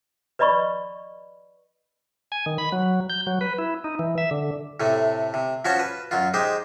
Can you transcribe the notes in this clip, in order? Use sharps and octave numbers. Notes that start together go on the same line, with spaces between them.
B4 D5 D#5 B5 C#6
G#5
D#3
B5
F#3
G6
F#3
B4
E4
D#4
E3
E5
D3
A2 C3 A3
C3
F3 C#4 F#4 C5 C#5 A5
B4
F#2 F#3 F4
G#3 D#4 G4 C5